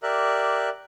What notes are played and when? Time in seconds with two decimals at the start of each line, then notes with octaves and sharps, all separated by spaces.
0.03 G4 A#4 D5 E5 F#6